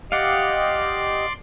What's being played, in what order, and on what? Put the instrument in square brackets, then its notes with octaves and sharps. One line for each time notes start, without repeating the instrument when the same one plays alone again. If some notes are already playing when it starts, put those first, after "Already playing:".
[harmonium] G4 D#5 [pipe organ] D5 C6 [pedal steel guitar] F5 F#5